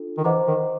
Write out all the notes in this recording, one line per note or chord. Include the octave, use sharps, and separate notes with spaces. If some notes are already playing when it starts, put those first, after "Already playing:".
Already playing: D4 F4 A4
D#3
E3 C5 D#5 F#5 A#5 D6
D#3